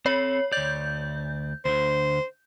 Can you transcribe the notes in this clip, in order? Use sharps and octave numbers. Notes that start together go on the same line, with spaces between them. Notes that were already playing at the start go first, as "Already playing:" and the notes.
C4 A4 C#5
D2 D5 G6
D2 D3 C5